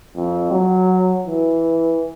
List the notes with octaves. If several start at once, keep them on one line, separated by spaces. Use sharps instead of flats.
F2
F#3
E3